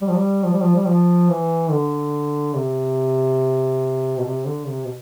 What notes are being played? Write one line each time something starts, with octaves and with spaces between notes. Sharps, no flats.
G3
F3
G3
F3
G3
F3
G3
F3
E3
D3
C3
B2
C3
D3
C3
B2